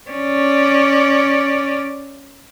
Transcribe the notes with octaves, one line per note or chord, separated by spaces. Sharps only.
C#4 D5